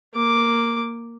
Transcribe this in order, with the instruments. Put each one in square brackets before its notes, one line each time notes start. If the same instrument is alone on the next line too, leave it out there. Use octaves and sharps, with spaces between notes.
[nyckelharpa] A#3 D6